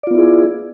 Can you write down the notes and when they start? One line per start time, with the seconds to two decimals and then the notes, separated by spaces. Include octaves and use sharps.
0.03 D5
0.07 F4
0.11 B3
0.15 E4
0.18 G#4